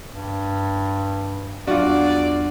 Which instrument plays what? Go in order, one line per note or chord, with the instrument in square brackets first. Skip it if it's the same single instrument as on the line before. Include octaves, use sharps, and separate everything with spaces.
[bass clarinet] G2
[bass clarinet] E2 [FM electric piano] F#3 D4 [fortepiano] F4 F#4 [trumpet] D5